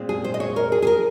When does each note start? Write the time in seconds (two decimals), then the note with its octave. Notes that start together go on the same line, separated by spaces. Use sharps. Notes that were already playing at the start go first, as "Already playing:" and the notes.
Already playing: A#2 G#3 C4
0.09 G#4
0.24 C5
0.34 D#5
0.40 C#5
0.56 A#4
0.72 G#4
0.82 G#4
0.87 A#4